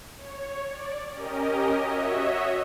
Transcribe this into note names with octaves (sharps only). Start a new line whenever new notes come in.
C#5
D5
C#4 G4 A#4 D#5
F#4 C#5 D#5 E5